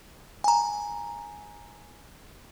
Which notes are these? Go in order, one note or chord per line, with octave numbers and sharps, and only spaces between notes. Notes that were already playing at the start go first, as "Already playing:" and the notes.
G#5 A#5